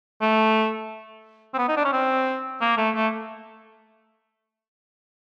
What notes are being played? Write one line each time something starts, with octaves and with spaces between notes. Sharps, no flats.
A3
C4
B3
D#4
D4
C#4
C4
A#3
A3
A3